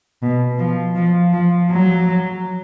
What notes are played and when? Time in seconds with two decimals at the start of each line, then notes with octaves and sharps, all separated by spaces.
0.21 B2
0.58 F3
0.95 F3
1.32 F3
1.70 F#3